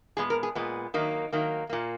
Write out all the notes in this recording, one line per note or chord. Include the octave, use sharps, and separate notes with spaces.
A#2 G#3 B3 G#4
A#4
G#4
A#2 G#3 B3
D#3 F#3 A#3 D#4
D#3 F#3 A#3
A#2 A#3